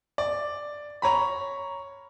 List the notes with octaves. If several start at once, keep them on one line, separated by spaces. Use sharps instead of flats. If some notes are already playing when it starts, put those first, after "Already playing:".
D5
C#5 A#5 B5